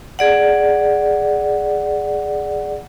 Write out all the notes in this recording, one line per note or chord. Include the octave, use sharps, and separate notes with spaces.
G#4 D5 F#5